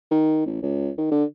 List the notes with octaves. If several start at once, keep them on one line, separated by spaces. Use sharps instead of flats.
D#3
A1
C#2
D#3
D3